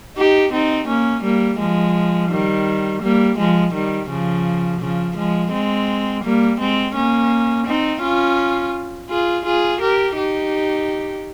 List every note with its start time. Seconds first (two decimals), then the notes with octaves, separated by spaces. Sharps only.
0.17 D#4 G4
0.53 C4 D#4
0.88 A#3 C#4
1.24 G3 A#3
1.60 F3 G#3
2.31 D#3 G3
3.03 G3 A#3
3.38 F3 G#3
3.74 D#3 G3
4.10 C#3 F3
4.81 C#3 F3
5.17 F3 G#3
5.53 G#3 C4
6.24 G3 A#3
6.60 G#3 C4
6.96 A#3 C#4
7.67 C4 D#4
8.03 C#4 F4
9.10 F4 G#4
9.46 F4 G#4
9.81 G4 A#4
10.17 D#4 G4